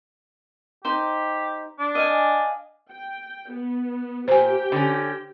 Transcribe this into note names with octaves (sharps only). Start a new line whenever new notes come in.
D#4 G4 C5
D4
D#5 F5 G#5
G5
B3
A#2 G4 C5 G5 G#5
D3 C#4